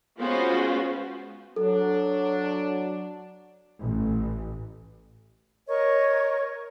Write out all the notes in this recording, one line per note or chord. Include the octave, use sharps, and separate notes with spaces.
G#3 B3 C#4 F4 F#4 C5
F#3 D4 A4
A1
A#4 C#5 D#5 C#6